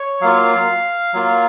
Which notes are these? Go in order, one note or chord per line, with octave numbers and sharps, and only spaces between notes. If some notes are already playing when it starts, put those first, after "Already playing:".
Already playing: C#5
F#3 A#3 F4 F5
F#3 A#3 F4